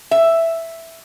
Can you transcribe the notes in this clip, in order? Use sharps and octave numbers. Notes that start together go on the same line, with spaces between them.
E5